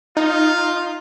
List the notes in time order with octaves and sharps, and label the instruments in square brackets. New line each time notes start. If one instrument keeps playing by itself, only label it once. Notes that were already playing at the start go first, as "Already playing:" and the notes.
[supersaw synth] D#4 [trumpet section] F4